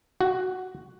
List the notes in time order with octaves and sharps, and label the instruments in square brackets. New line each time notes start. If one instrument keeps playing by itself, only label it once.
[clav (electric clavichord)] F#4